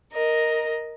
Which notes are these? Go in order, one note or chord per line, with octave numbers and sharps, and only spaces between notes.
A#4 D#5